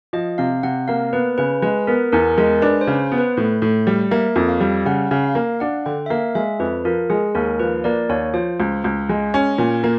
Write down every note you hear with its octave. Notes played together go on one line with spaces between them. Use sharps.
F3 D#5
C3 F5
C3 F#5
A#3 F5
B3 B4
C#3 B4
G#3 B4
B3 A#4
E2 A#4
G#3 A#4
D4 B4
C5
C#3
C5
B3
B4
A2
A2
G3
A#3 E5
F2
F5
G3
C#3 F#5
C#3
F5
A#3
F5
D4 F#5
D3 G5
E5
A#3 F5
G#3 E5
F2 B4
F3 A#4
G#3 G#4
D#2 A#4
F3 B4
A#3 D5
D#2 C#5
F3 C5
C#2
C#2
G#3
C#4
A#2
A#3